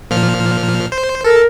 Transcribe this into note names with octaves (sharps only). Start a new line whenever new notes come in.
A#2 F3 F6
C5
A4 A#4